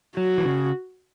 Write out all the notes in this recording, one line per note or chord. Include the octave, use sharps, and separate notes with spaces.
F#3 F#4
E3
C#3